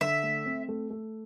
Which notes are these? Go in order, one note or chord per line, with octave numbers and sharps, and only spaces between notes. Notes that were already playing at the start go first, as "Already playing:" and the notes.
D3 E5
A3
C4
A3
A3